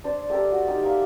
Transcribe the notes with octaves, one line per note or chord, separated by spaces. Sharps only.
D4 C5
A3 G4 A4 A#4
F#4
D#4 G4
A#3 E5